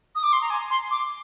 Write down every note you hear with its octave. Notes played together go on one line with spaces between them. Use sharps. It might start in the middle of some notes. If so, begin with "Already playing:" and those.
D#6
D6
C6
A#5
G#5
C6
D6